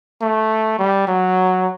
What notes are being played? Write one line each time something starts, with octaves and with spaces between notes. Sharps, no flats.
A3
G3
F#3